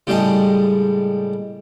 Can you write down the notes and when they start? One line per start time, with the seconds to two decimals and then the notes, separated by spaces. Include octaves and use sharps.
0.07 A2 C#3 G3 G#3 D#5 A5